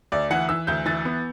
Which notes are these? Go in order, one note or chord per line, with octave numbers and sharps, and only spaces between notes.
D2 D5
E3 F#5
E3 E6
D2 G6
E3 A6
B3